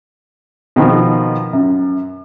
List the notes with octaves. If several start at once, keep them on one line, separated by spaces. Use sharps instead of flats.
B2 D#3 F3
F#2